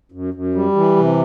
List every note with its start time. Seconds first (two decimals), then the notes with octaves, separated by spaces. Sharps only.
0.12 F#2
0.34 F#2
0.54 G3
0.75 E3
0.96 C3